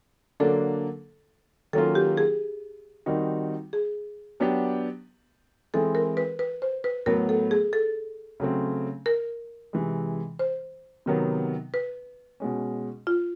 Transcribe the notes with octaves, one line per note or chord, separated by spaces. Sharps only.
D3 F#3 A#3 D4 A4
D#3 F#3 A#3 C#4 F4 A4
G4
G#4
D#3 G3 C4 D#4 F#4
G#4
F#3 B3 D4 G4
E3 G#3 C4 E4 G#4 A4
A#4
B4
B4
C5
B4
A2 F#3 B3 A#4
A4
G#4
A4
C#3 F#3 A3 C4
A#4
C3 E3 G#3
C5
C3 D#3 F#3 B3
B4
B2 G#3 C#4
F4